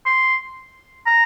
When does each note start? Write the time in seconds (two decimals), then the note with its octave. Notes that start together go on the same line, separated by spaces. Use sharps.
0.06 C6
1.06 A#5